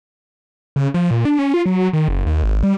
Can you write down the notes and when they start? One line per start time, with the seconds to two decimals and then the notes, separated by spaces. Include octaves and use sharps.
0.76 C#3
0.94 F3
1.11 A#2
1.25 D4
1.39 C#4
1.54 F4
1.66 F#3
1.93 D#3
2.08 F#1
2.26 D#2
2.43 G#1
2.63 G3